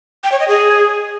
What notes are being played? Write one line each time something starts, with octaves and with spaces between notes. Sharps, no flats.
G5
C#5
D#5
G#4